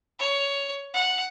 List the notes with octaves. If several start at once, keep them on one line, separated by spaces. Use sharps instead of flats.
C#5
F#5